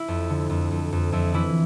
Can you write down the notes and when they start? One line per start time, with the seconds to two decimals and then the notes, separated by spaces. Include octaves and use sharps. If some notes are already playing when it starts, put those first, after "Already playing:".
Already playing: E4
0.08 F2
0.30 D3
0.50 F2
0.71 F2
0.92 F2
1.12 F2 E4
1.34 E3 E4